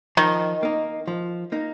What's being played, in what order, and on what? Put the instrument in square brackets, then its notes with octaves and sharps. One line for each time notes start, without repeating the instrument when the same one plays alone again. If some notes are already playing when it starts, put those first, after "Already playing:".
[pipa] D#3 [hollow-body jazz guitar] F3
[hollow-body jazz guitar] A#3 D#4
F3
A#3 D#4